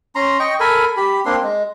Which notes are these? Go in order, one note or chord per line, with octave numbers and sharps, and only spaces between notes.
C#4 A#5 C6
D#5 G5 C#6
A4 A#4 G#5 B5
G4 B5
A#3 C4 D4 C6
G#3